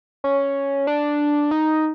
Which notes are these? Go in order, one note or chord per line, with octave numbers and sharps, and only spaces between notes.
C#4
D4
D#4